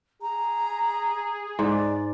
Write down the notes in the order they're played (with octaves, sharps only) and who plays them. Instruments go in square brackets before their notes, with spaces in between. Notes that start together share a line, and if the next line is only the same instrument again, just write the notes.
[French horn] G#4 [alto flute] A#5
[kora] G#2 [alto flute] D5